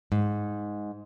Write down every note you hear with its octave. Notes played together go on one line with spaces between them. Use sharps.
G#2